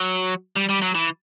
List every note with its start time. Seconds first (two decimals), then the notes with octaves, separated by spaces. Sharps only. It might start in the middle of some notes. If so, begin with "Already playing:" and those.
Already playing: F#3
0.56 G3
0.69 G3
0.82 F#3
0.95 E3